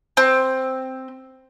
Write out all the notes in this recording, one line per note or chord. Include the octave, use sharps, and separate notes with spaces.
C4